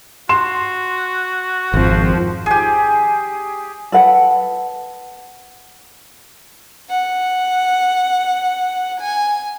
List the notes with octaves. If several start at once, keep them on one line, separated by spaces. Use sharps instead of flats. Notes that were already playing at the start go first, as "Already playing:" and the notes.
F#4 C6 E7
G#1 F2 F3
G4 G#4
A4 B4 F#5
F#5
G#5